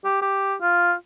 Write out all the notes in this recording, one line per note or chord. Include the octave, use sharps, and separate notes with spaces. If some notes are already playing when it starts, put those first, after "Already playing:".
G4
G4
F4